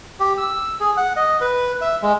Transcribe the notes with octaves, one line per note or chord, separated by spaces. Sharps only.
G4
E6
G#4
F#5
D#5
B4
E5
G#3